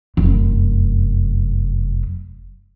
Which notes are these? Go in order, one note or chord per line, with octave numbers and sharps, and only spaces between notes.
F1 F#2